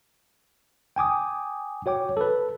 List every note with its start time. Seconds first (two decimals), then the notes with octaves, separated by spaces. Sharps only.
0.96 G5 G#5 D6 D#6
1.86 F#4 C#5 G5 D6
2.17 A4 B4